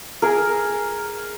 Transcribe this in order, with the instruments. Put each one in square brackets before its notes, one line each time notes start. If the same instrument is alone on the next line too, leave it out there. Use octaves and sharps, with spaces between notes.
[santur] G#4 A#4